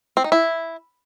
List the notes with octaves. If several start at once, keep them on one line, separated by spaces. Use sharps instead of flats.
C4
D#4
E4